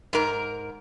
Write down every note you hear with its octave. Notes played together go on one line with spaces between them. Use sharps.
G#2 A#4